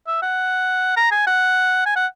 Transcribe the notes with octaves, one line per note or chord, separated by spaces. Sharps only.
E5
F#5
A#5
G#5
F#5
G#5
F#5